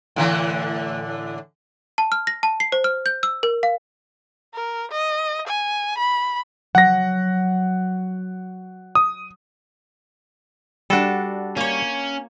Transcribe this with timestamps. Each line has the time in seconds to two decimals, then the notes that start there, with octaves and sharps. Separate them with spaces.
0.16 A2 D3 E3
1.98 A5
2.12 F6
2.27 A#6
2.43 A5
2.60 C7
2.72 C5
2.84 F6
3.06 G6
3.23 E6
3.43 A#4
3.63 F5
4.54 A#4
4.91 D#5
5.47 G#5
5.98 B5
6.75 F#3 F#5 A#6
8.95 D#6
10.90 G3 D4 F#4 A4 F#5
11.57 A#3 C#4 C#5